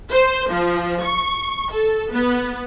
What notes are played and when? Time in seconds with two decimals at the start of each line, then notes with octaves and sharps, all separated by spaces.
0.11 C5
0.50 F3
1.03 C#6
1.72 A4
2.12 B3